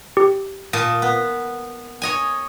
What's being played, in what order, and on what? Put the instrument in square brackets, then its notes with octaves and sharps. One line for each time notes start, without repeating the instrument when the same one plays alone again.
[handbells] G4
[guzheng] A#2 D#5 A5
B3
C#5 D#5 G#5